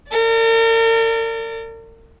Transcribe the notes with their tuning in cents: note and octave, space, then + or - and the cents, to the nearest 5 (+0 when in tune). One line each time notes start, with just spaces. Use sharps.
A#4 -40 D5 -10